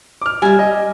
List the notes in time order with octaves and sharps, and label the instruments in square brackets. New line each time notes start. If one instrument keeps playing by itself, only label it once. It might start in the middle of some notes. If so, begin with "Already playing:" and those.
[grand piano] D6 F6
[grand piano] G3 [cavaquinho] E5 G#5
[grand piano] D#5